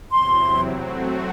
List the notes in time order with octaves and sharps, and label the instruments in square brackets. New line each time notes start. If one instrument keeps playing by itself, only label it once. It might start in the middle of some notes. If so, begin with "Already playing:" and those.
[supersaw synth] E2 C3 F#3 C4 E4 [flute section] C6
[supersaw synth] F#3 A3 C4 F#4